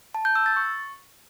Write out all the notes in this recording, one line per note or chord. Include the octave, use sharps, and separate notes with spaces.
A5
G6
E6
A6
C#6